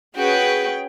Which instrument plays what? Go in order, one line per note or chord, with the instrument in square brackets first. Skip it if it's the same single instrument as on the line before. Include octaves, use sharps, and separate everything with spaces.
[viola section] C#4 G#4 G5 [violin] F#4 B4